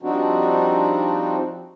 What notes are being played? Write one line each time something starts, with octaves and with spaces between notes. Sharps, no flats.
F3 G3 C4 D4 D#4 F#4